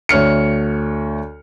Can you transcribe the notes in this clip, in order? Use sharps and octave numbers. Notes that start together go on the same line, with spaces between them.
D2 C#5 F6 C#7